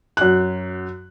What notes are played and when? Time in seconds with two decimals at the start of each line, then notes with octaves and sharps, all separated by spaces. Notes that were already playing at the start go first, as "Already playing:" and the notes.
0.17 F#2 F#6